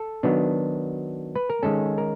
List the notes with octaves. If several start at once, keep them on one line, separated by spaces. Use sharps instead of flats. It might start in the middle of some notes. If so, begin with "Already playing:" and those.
Already playing: A4
D#3 F#3 B3 D4
B4
A#4
D#3 G#3 C#4 A4
A#4